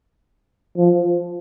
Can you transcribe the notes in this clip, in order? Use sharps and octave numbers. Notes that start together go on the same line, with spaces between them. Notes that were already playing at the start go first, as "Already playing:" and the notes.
F3